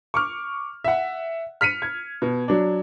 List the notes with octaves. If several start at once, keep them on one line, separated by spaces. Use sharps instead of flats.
C#6 D6 F6
E5 F#5
F6 B6 C#7 D#7
G#6
B2
F#3 D4